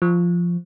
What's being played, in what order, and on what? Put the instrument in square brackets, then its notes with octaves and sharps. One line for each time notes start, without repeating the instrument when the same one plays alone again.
[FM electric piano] F3